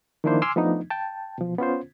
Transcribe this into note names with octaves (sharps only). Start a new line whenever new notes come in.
D#3 F3 A#3 D4 E4 C5
G#5 C6 D6 E6 F6
F3 A3 B3 D4 D#4
G5 A5
B2 F3
B3 C#4 F4 C5